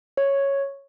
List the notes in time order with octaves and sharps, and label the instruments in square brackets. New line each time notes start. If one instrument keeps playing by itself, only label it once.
[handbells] C#5